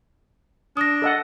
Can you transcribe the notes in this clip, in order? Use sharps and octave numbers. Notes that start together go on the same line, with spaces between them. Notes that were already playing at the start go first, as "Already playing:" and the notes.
D4 D#6 A#6
A4 D#5 F#5